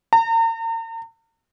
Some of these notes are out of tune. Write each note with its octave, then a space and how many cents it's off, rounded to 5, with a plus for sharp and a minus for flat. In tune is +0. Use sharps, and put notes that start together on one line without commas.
A#5 -40